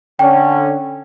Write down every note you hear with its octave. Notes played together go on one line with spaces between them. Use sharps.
D3 C#4 G5